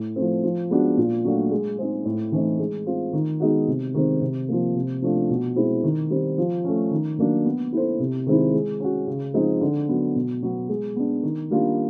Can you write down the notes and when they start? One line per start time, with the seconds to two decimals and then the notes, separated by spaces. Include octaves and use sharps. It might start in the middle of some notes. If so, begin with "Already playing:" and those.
Already playing: A2
0.16 F3 A3 C4
0.43 F3
0.70 G#3 B3 D4 F#4
0.97 A#2
1.24 F#3 A3 D4 F4
1.51 G#3
1.78 C4 D#4 G#4 C5
2.05 A2
2.32 E3 A3 C4 D#4
2.59 G#3
2.86 C4 F4
3.13 D#3
3.40 G#3 B3 D#4 F#4
3.67 C3
3.94 D#3 G#3 C4
4.21 C3
4.49 F3 A#3
4.75 C3
5.02 F3 A3 D4 F4
5.29 B2
5.56 G#3 C4 E4
5.83 D#3
6.10 G3 C4
6.38 F3
6.64 A3 C#4
6.91 D#3
7.19 F#3 A#3 D4
7.45 B3
7.73 E4 A4 C5
8.00 C3
8.26 D#3 G#3 C4 E4
8.54 G#3
8.80 C#4 F#4
9.07 C#3
9.34 F3 G#3 C4 D#4
9.61 D3
9.88 F#3 B3
10.15 B2
10.43 F#3 B3
10.69 G#3
10.96 B3 D4
11.23 D#3
11.51 G3 A#3 D4 F4